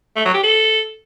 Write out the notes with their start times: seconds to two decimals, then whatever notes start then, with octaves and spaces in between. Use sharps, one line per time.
0.16 A3
0.25 F#3
0.34 G4
0.44 A4